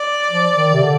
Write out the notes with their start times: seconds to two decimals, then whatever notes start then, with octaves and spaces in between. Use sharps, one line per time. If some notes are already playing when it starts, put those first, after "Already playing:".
Already playing: D5
0.30 F3
0.56 D#3
0.74 C3
0.82 D3